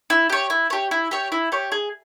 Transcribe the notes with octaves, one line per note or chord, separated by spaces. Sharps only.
E4
G4 C#5
E4
G4 C#5
E4
G4 C#5
E4
G4 C#5
G#4